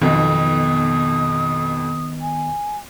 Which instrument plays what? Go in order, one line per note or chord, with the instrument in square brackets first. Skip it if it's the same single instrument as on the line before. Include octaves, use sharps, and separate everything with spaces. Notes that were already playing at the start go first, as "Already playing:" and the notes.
[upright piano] B1 F2 B2 [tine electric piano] D#3 B3 D#5 [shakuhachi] D#6
[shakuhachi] G#5